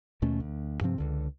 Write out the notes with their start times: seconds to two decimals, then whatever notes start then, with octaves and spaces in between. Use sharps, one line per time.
0.22 D#2 B2 A3 C#4
0.40 D2
0.81 G2 C3 F3 C4
0.98 C#2 D3